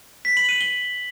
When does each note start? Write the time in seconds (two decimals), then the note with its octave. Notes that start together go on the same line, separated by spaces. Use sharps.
0.25 B6
0.37 F#7
0.49 D#7
0.61 G7